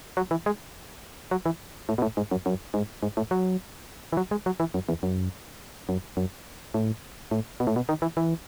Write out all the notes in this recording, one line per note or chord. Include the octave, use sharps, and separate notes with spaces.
F#3
E3
G#3
F#3
E3
A2
B2
A2
G#2
F#2
F#2
G#2
G#2
A2
F#3
E3
F#3
G#3
F#3
E3
F#2
E2
F#2
F#2
F#2
A2
A2
B2
A2
B2
D#3
E3
E3